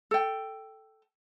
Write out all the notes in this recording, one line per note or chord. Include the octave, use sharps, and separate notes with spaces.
A4 G5